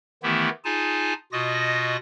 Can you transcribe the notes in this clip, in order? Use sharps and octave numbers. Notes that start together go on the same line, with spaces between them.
D#3 E3 A3 B3 E4 G4
D#4 F4 G#4 G#5 A5
B2 F4 F#4 D#5 D#6 A#6